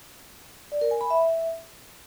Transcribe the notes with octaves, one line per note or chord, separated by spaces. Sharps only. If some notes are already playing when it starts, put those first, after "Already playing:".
D5
A#4
G#5
B5
E5